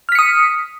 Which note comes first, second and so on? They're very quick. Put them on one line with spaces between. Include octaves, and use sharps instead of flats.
F6 B6 C#7 D#6